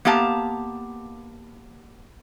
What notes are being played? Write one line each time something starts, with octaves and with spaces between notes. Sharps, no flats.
A#3 B3 G4 F5 A5 A#5